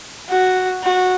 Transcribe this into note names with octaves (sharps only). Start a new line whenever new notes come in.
F#4
F#4